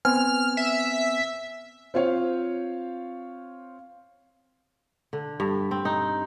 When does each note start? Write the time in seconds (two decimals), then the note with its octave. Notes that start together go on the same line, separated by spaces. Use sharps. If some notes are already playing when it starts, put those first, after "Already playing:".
0.05 B3 C4 G#5 F6
0.57 E5
1.94 C4 F4 C5 C#5 F5
5.13 D3
5.40 G2
5.71 C4
5.85 D#4